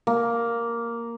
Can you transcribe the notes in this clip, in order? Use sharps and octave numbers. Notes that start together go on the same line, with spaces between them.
A#3